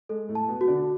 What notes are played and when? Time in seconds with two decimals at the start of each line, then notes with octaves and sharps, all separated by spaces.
0.09 G#3 A4
0.29 A2 A3
0.35 A5
0.48 B2 B3
0.61 F#4
0.68 D3 D4